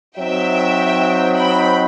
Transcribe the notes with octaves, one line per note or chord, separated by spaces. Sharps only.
F#3 C4 D#4 E5 G5
G5 B5